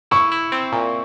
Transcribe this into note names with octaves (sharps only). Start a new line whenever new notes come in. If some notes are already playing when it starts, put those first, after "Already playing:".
E4 C#6
E4
C4
A#2